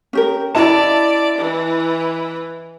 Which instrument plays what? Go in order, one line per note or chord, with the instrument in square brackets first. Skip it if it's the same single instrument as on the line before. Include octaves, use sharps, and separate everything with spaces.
[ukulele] C#4 G4 A#4
[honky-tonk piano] E4 D#5 A5 [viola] D5
[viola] E3